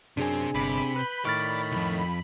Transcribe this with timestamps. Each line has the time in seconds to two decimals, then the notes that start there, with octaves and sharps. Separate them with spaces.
0.17 F#2 C3 C4 D4 G#4 G#5
0.54 G1 C3 B5 D6
0.96 B4 G6
1.25 A2 D#3 D5 C#6 F6 A6
1.72 B1 F2